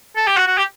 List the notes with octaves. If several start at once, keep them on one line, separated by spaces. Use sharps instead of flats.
A4
G4
F#4
F#4
G4